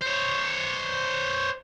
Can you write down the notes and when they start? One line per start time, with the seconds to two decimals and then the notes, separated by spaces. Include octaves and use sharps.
0.01 C5 C#5